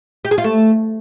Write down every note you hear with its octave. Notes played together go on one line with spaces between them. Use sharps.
G4
G#4
F4
A3